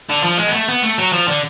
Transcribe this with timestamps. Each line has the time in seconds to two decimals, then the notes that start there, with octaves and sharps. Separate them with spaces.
0.10 D3
0.24 F3
0.38 G#3
0.48 B3
0.53 A3
0.69 B3
0.83 A3
0.98 F#3
1.12 F3
1.28 D3